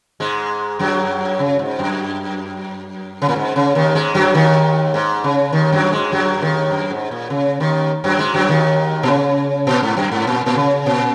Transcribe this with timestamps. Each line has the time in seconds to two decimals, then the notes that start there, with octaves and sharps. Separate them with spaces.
0.20 G#2 G#3
0.79 F#2 F#3
1.39 C#3
1.59 G#2
1.79 F#2
3.22 C#3
3.29 A#2
3.36 G#2
3.56 C#3
3.75 D#2 D#3
3.95 G#2 G#3
4.14 F#2 F#3
4.34 D#2 D#3
4.94 G#2
5.24 C#3
5.52 D#2 D#3
5.72 F#2 F#3
5.92 G#2 G#3
6.12 F#2 F#3
6.41 D#2 D#3
6.71 F#2
6.91 G#2
7.11 A#2
7.30 C#3
7.60 D#2 D#3
8.04 F#2 F#3
8.19 G#2 G#3
8.34 F#2 F#3
8.49 D#2 D#3
9.03 A#2
9.08 C#3
9.67 A#2
9.83 G#2
9.97 F#2
10.12 G#2
10.27 A#2
10.46 A#2
10.56 C#3
10.86 A#2